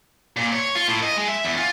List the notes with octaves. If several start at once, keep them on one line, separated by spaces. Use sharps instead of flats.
A#2
C#5
F4
A2
D#5
G#3
E5
E2
F4